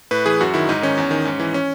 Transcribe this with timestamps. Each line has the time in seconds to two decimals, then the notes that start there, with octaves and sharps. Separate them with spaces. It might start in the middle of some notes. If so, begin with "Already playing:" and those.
0.11 A2 B4
0.26 E3 G#4
0.41 F#2 F#4
0.54 D#3 E4
0.69 G#2 D#4
0.82 D#3 C#4
0.98 E2
1.11 D#3
1.25 G#2
1.39 E3
1.54 C#4